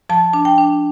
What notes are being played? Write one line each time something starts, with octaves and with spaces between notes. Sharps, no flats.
F3 A5
D4
G5
D4